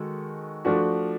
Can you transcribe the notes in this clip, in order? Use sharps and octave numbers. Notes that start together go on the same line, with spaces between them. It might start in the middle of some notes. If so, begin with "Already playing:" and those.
Already playing: D#3 G#3 F#4 A4
F3 A3 D4 F#4